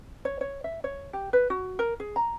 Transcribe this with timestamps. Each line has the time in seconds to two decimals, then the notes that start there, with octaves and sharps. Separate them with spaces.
0.25 C#5
0.41 C#5
0.64 E5
0.84 C#5
1.13 G4
1.33 B4
1.50 F#4
1.79 A#4
2.00 G#4
2.16 A#5